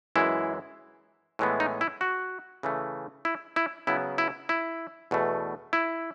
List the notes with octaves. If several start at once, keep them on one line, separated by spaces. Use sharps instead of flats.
F#2 E3 G#3 E4
A2 E3 G#3 B3
D#4
E4
F#4
C#3 E3 A3
E4
E4
C#3 F#3 B3 E4
E4
E4
E2 B2 A3
E4